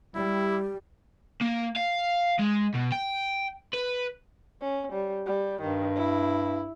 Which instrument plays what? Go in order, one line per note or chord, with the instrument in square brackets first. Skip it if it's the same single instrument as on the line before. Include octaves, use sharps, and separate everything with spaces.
[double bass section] G3 [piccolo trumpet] E4 [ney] G4
[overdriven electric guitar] A#3
F5
G#3
B2
G5
B4
[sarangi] C#4
G3
G3
[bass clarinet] G2 [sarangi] D#3
[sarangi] E4